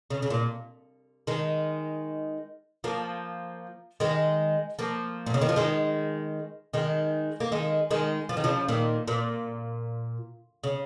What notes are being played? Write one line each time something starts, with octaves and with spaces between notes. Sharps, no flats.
C#3
C#3
A#2
D#3 G#3
F3 A#3
D#3 G#3
F3 A#3
A#2
C#3
D#3
F3
D#3 G#3
D#3 G#3
A#3
D#3 G#3
D#3 G#3
F3
D#3
C#3 F3
A#2 D#3
A#2
C#3